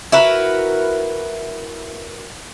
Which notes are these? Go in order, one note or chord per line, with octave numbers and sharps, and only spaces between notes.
E4 F#4 A#4 B4